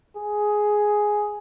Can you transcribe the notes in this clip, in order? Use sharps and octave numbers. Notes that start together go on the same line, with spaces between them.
G#4